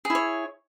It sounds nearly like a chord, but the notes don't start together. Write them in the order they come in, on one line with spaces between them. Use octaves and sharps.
G#4 E4 C#5